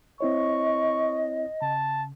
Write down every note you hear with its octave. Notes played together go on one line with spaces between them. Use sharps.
C4 E4 C#5 D#5 C#6
C#3 A5